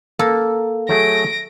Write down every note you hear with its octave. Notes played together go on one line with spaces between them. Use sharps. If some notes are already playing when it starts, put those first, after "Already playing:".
A#3 A4
F#3 A3 G#4 A#6 D7